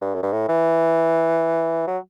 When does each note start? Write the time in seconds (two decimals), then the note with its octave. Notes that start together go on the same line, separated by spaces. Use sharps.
0.02 G2
0.15 F#2
0.23 G2
0.33 A2
0.49 E3
1.87 F#3